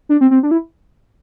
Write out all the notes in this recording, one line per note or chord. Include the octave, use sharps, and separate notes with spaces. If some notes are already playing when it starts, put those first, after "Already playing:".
D4
C4
C4
D4
E4